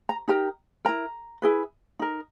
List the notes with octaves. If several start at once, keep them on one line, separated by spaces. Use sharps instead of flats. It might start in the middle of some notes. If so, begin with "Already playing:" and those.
A#5
D#4 G4 A#4 A#5
E4 A#4 A#5
E4 G#4 B4
D#4 A#4